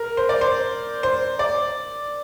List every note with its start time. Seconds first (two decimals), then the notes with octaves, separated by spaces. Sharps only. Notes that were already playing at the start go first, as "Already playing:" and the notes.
Already playing: A#4
0.17 C5
0.29 D5
0.41 C5
1.03 C5
1.39 D5